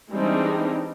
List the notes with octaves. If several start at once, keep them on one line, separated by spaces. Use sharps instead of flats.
E3 G3 G#3 C4 D4 D#4